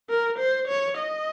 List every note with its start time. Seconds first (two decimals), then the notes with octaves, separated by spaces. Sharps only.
0.09 A#4
0.38 C5
0.68 C#5
0.97 D#5